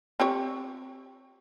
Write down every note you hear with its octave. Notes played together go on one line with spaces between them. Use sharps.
C4 G4 C#5